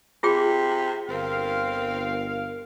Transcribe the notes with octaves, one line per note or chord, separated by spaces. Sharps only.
C3 F4 G#4 G5
G1 C4 A#4 F5